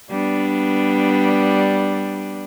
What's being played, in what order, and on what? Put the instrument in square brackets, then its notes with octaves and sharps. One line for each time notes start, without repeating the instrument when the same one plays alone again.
[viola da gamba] G3 B3 D4